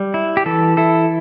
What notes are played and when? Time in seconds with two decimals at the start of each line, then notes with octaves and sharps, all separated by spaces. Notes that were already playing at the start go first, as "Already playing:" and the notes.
Already playing: G3
0.14 E4
0.37 G4
0.46 E3 A4
0.77 E4 A4